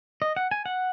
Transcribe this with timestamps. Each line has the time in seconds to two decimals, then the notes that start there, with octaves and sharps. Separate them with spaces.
0.22 D#5
0.37 F#5
0.51 G#5
0.66 F#5